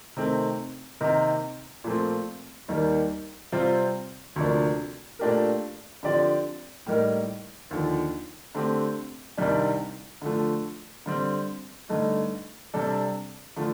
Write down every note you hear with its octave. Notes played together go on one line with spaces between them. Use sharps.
C3 D#3 A3 C4
C3 D#3 A#3 D#4 A#4
A#2 F3 A3 C4
D#2 D#3 G3 A#3
C3 G3 C4 F4 C5
D2 C3 F3 A#3 D4
A#2 A3 D4 G4 A#4
D3 F3 C4 G4 D5
A2 G3 A#3 D#4 A#4
D#2 D3 F3
D3 A3 C4 G4
C2 C3 D#3 G3 D4
D3 F3 A3
D3 G3 C4
G2 D3 A3 D#4
C3 G3 D4 A4
D3 F3 A3